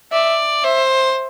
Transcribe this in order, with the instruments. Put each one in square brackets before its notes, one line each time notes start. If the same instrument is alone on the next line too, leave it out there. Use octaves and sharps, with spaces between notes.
[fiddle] D5 [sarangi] E5
[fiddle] C5 [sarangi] E5